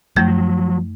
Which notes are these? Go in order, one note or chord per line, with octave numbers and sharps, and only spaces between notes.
F#2 F3 F#3 A3 G6